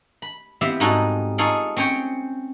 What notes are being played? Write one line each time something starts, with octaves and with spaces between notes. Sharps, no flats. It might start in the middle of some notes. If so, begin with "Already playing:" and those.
B5
B3 C4 E4 G4 E5 F5
G#2 G3 D#4 F#4 A4 G#5
D#4 F4 G#4 A4 C#5 F5
C4 C#4 C5 C#5 G5